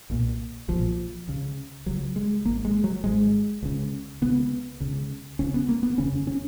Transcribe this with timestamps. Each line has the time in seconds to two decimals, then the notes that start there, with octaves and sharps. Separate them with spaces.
0.10 B1 A#2
0.68 B1 A#2 F3
1.28 C#2 C#3
1.86 C#2 C#3 F#3
2.16 G#3
2.45 G#1 A#3
2.49 G#2
2.65 G#3
2.84 F#3
3.04 G#1 G#2 G#3
3.63 C#2 C#3
4.22 C#2 C#3 B3
4.80 C#2 C#3
5.39 C#2 C#3 C#4
5.54 B3
5.69 A#3
5.83 B3
5.98 F1 D#2 C#3 C#4
6.27 C#4